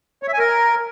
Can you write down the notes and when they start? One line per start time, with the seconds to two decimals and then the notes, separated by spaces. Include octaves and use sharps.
0.23 C#5
0.28 E5
0.33 G#5
0.39 A#4